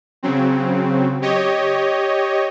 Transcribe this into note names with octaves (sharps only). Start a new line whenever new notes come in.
C#3 F#3 C4
G4 C#5 D#5